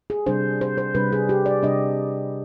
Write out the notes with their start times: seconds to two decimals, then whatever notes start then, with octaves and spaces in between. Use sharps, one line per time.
0.10 G#4
0.26 C3 G3 D4 C5
0.61 C5
0.78 C5
0.95 C3 G3 D4 B4
1.12 G#4
1.29 G4
1.46 D5
1.63 C3 G3 D4 D#5